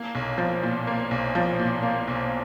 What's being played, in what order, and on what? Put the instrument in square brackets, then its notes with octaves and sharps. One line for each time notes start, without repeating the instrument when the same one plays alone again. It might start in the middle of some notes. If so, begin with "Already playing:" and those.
Already playing: [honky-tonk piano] A#3
B1
F3
A#2
A#3
B1
F3
A#2
A#3
B1